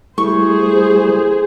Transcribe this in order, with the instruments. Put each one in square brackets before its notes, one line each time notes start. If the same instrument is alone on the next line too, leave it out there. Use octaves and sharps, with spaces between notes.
[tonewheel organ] G3 A3 [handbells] E4 [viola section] G#4 C5 [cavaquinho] C#6